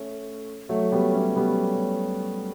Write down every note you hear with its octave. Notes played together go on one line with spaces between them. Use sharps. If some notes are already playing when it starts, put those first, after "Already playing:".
Already playing: A3 C#4
F#3 A3
G3 B3
A3 C#4
G3 B3